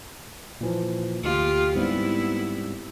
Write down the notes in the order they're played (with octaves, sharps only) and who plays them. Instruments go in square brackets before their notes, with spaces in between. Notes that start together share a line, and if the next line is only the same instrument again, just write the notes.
[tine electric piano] A#2 E3 F3
[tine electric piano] D2 [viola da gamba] F4 G4
[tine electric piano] G#2 G3 C4 [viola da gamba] B3 E4